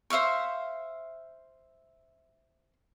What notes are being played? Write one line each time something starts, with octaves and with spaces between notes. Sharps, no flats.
C5 E5 F5 C#6